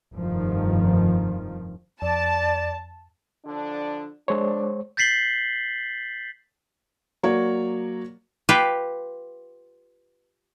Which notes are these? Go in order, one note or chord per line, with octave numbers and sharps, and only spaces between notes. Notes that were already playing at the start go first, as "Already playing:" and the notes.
F1 G2 D#3 F3
F2 D5 A5
D3 F3 D4
G#3 D4 C5 C#5
G6 A6 B6 C7 F#7 G7
F#3 A#3 F#4 C#5 D5
F4 G4 B4